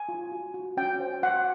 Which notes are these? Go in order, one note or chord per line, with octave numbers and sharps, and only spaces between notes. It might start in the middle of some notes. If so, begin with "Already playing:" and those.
Already playing: G#5
F4
F#4
F#4
C#4 G5
C5
F#4 F#5